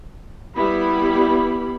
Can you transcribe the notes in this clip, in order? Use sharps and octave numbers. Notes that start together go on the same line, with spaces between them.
G3 B3 E4 G4 B5